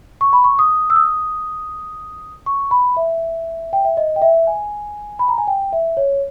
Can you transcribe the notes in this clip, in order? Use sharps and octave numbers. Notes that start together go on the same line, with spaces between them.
C#6
B5
C#6
D#6
E6
D#6
C#6
B5
E5
G5
E5
D#5
G5
E5
G#5
B5
A#5
G#5
G5
E5
C#5